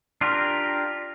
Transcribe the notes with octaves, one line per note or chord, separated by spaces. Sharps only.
D4 F4 G4 A#4